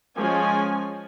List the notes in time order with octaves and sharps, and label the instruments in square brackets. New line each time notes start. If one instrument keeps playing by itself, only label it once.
[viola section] F3 G#3 C#4 G#5